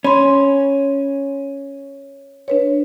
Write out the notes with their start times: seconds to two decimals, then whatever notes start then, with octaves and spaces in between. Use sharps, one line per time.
0.04 C#4 B5 C6
2.48 D4 B4 C#5